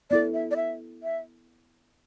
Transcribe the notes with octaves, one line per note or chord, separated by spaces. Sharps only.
B3 E4 A4 D5
E5
D5
E5
E5